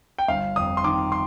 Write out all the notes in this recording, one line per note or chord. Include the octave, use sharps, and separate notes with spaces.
G5
G1 F5
F2 D#6
C6
D#3 D6
C6